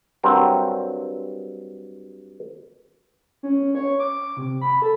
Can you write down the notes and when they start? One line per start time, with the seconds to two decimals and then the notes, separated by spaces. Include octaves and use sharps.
0.23 G2 F#3 C4 A#4
3.43 C#4
3.75 C#5
4.00 D6
4.37 C3
4.61 B5
4.82 A4